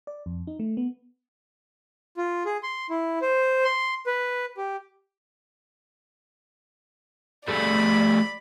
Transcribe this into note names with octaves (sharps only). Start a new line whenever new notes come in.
D5
F2
D#4
A3
B3
F4
G#4
C6
E4
C5
C6
B4
G4
G3 A3 D5 B5